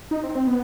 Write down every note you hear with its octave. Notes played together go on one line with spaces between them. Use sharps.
D#4
C4
C4
B3